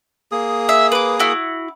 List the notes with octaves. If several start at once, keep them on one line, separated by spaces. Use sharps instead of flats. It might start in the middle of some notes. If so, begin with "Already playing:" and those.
A#3 G#4 D#6
E5
B4 D6
E4 F#4